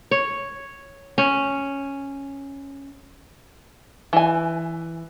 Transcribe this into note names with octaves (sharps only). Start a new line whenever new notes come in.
C#5
C#4
E3 G#5